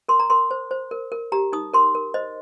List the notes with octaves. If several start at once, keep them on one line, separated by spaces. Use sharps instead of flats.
A#4 C6
A#5
A#4 C6
C5
C5
A#4
A#4
G4 A#5
D#4 D#6
A#4 C6
A#4
C5 D#5